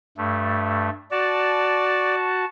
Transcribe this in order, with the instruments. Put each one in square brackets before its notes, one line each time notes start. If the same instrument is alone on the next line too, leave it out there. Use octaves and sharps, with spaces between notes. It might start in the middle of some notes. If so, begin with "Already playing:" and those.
[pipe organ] G2 A3
[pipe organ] F#4 A5 [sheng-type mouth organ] D5